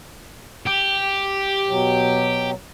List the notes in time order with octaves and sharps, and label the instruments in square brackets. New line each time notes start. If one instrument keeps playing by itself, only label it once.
[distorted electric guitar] G4
[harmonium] B2 F#3